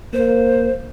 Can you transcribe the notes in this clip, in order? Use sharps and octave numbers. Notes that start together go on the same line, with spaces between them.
A#3 C5